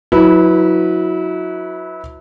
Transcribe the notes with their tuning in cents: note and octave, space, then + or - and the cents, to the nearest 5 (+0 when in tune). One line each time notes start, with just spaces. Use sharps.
F#3 -20 E4 -30 B4 +0